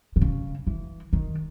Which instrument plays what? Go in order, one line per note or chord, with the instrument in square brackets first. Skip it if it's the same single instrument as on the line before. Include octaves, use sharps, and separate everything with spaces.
[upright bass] D#3
C#3
E3
D#3